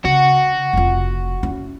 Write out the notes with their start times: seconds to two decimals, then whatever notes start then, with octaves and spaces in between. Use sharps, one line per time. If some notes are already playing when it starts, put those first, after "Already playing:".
0.05 C#3 F#4
0.73 F1 F4
1.43 C#4 E4